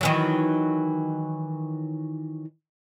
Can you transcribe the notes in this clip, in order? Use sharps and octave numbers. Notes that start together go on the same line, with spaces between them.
D#3 E3 F#3